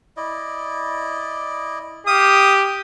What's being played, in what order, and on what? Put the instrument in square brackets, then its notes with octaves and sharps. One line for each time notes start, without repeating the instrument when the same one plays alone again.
[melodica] E4 D5 D#5
[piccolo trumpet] G4 [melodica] F5 [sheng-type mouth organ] D#6